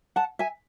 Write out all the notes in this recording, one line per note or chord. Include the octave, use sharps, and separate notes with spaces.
F#5 A5
E5 G#5